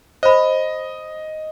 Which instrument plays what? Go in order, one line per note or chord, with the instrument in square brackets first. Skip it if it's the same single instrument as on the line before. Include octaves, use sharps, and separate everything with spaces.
[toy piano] C5 B5 [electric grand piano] D#5